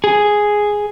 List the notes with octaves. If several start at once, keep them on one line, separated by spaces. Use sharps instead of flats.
G#4